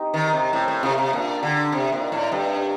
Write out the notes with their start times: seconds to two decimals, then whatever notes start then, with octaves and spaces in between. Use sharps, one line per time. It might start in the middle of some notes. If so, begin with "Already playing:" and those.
Already playing: C4 D#4 G4
0.14 D#3
0.23 A#4
0.28 D#5
0.33 C3
0.53 A2 C4
0.68 A2
0.83 C3 F4 A#4
0.98 C3
1.13 A#2 D4
1.42 D3 G4 D5
1.72 C3 C4
1.92 A#2
2.01 D#4 A#4
2.12 A2
2.31 G2 G3
2.62 A#4